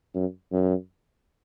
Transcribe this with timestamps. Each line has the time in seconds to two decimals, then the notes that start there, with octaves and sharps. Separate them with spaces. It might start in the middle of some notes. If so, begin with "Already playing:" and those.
0.15 F#2
0.52 F#2